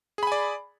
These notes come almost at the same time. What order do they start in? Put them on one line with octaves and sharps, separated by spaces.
G#4 B5 G#5 D5